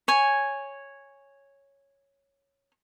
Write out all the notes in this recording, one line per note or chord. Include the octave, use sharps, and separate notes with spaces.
C#5 G#5